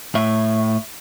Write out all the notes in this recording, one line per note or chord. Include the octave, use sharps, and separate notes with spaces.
A2 E5